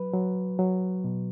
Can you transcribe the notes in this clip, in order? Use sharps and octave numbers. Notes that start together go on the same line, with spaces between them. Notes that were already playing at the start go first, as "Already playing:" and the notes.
Already playing: F#3 B4
F#3
F#3
B2